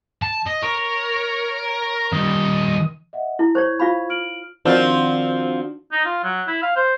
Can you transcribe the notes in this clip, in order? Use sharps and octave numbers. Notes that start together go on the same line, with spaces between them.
A5
D#5
A#4 C#5
D#3 G3 D#5
D#5 E5 F#5
E4 A5
C5 C#5 C#6 G#6
F4 F5 B5
F6 D7 F#7
D#3 F3 C4 D4 F4 F#4
D#4
F4
F#3
E4
F5
C5